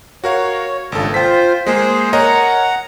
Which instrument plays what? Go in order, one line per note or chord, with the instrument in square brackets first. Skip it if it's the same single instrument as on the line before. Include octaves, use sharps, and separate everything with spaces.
[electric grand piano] F#4 A#4 F5 [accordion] C#5
[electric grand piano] G#1 A4 [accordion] G2 A#2 C#3
[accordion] F4 C5 [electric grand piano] G5 B6
[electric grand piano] G#3 A#3 [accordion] G#4 C5
[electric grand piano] A#4 C#5 D#5 [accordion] F#5 A#5